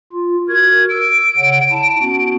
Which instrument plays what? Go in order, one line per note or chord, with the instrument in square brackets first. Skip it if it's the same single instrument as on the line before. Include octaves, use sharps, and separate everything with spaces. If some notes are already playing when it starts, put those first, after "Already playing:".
[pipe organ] F4
[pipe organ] F#4 A#4 [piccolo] G#6
[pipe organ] E6 [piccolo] D7
[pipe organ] C#3 C#5 F#5
E4 A5
B3 C#4 F#4